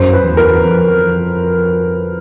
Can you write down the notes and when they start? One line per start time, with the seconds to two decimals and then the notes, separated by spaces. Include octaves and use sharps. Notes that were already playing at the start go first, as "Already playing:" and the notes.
Already playing: F#2 C5
0.13 B4
0.26 E2
0.37 A#4
0.62 F2